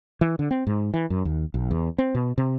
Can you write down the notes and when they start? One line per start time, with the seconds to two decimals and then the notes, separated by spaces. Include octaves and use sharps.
0.21 E3
0.39 D3
0.51 C4
0.67 G#2
0.94 E3
1.10 F#2
1.25 D#2
1.54 B1
1.71 E2
1.98 C4
2.15 B2
2.38 C3